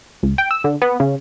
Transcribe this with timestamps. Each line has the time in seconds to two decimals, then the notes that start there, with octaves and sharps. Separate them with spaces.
0.23 C#2
0.38 G5
0.51 E6
0.64 D3
0.82 B3
1.00 C#3